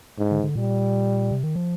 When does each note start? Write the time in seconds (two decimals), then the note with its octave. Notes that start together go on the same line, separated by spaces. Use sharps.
0.18 G#2
0.31 D3
0.43 D3
0.55 A#2 G3
1.31 C3
1.43 D#3
1.56 F3